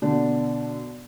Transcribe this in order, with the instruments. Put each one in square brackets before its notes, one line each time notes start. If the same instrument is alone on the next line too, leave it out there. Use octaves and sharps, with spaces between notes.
[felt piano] B2 D3 D4